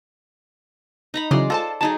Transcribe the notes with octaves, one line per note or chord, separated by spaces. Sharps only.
D#4 A#5 B5
C#3 E3 F#3 G#3 D5 C6
F4 A4 C5 A5
F#3 D#4 G#4 A5